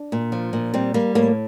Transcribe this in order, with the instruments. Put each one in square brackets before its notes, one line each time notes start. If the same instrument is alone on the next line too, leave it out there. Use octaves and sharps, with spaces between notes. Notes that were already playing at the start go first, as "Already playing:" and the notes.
Already playing: [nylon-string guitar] D4
A#2
F3
A#2
G3 C4
G3 A#3
A2 A#3